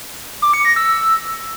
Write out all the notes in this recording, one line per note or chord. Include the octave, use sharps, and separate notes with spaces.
D6
C#7
A#6
E6